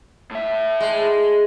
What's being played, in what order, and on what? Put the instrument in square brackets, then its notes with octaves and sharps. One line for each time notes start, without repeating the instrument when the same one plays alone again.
[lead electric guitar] A2 E5
[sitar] G#3